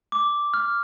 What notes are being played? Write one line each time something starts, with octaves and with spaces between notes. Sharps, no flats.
D6
F6